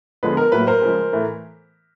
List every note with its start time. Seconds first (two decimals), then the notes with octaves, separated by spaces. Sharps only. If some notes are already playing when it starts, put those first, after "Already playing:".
0.23 D3 F3 G#3 B3 B4
0.37 A#4
0.52 A2 F#3 A#3 B4
0.67 A#4 C5
0.82 C#3 F3 G#3
1.12 A2 E3 A3